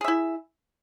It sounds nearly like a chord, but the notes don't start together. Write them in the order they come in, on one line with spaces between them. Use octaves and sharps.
G#4 E5 E4